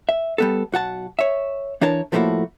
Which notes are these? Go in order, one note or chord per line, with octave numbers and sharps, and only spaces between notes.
E5
G3 B3 A4
B1 F#4 F#5 A5
C#5 E5
E3 D4 A#4 C#5 A5
A2 F3 A3 A#3 E4 F#4